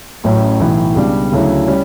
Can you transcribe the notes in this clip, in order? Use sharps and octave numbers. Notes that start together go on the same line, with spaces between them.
A1 A2 F#3 A3 C#4
B1 A2 E3
C#2 B2 G3 D4
D2 C#3 F#3 A3 E4
G3 C#4